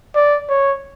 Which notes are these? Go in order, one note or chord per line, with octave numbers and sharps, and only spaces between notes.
D5
C#5